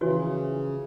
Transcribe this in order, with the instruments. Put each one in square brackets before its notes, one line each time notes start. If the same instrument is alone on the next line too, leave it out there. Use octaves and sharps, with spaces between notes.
[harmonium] C#3 [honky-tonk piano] E3 F3 [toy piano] F#4 C#5